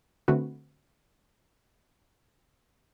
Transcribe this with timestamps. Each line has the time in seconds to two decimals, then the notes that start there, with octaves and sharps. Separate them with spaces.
0.28 D3 A3 C4 F#4 B4